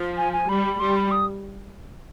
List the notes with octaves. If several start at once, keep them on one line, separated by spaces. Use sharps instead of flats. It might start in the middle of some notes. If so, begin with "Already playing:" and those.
Already playing: F3
G#5
G#5
G3 B5
G3 C6
B5
D#6